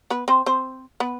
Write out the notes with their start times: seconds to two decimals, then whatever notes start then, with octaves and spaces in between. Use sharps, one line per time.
0.10 B3 B4
0.28 C4 C5
0.46 C4 C5
1.00 B3 B4